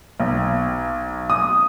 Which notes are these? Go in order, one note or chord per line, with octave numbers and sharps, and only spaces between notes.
B1
D#6